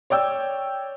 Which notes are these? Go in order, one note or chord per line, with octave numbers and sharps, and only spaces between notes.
C#5 D5 G5 E6